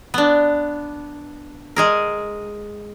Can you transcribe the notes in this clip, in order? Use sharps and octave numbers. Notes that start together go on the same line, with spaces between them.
B3 D4
G#3 G#4 A#4